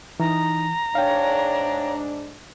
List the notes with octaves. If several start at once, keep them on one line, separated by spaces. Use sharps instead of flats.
E3 D#4 A#5
G#2 D4 C#5 F5 G5